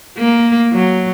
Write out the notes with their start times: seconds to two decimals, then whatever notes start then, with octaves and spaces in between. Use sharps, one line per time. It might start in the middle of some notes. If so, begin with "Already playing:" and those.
0.18 A#3
0.73 F#3